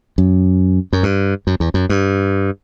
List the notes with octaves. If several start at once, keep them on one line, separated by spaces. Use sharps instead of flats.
F#2
F#2
G2
F#2
E2
F#2
G2